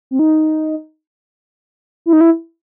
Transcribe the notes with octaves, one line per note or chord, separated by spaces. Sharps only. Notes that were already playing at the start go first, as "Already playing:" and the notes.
C4
D#4
E4
D#4
E4